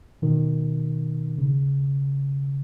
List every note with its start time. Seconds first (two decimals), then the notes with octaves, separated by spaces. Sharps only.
0.22 B2 D#3
1.38 C#3